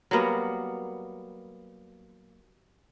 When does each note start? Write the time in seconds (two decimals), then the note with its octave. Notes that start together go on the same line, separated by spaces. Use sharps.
0.11 F#3 G3 A#3 B3